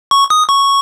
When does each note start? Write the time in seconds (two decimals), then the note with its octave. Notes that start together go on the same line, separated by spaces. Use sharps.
0.11 C#6
0.30 D#6
0.49 C#6